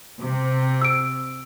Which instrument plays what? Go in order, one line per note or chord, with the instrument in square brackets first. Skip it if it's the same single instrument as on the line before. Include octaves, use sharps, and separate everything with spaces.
[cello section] C3
[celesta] E6 D7